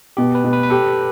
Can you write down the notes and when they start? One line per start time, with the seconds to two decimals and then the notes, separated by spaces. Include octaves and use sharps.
0.17 B2 G4
0.35 B4
0.44 B2
0.53 B4
0.63 B4
0.70 G4 A4